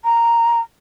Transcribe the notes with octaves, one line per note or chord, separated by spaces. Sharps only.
A#5